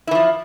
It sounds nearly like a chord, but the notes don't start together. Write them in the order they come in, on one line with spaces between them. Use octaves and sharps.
E4 E3 F3